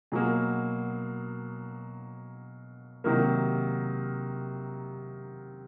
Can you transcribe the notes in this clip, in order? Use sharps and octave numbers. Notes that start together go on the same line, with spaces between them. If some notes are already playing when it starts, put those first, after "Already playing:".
B2 F#3 A#3 G#4
C3 D#3 F#3 A#3 A#4